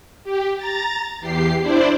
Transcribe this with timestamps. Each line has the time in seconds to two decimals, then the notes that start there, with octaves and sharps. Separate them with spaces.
0.24 G4
0.57 A#5 A6
1.20 E2 G4 C7
1.61 D4 E4 C5 D5